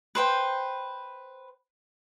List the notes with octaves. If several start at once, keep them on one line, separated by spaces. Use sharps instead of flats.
B4 C5 G5